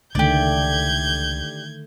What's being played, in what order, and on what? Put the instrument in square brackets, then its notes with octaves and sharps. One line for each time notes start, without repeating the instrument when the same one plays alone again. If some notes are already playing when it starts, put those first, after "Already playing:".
[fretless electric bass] C#2 [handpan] D3 D#3 A3 [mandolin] G4 D5 [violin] G6 G#6